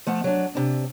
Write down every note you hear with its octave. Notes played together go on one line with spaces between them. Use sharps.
F3 A3 F#5
F#3 D4
C3 D4